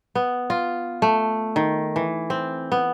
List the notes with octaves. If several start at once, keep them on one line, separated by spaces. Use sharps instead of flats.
B3
F4
A3
D#3
E3
C4
B3